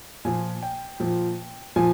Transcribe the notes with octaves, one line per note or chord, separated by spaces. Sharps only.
A#2 F3 G#5
G5
A#2 F3
A#2 F3 G#5